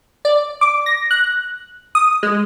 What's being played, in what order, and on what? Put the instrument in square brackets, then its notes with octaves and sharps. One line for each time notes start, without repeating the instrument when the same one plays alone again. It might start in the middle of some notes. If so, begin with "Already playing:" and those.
[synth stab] D5
D6
A#6
F#6
D#6
G#3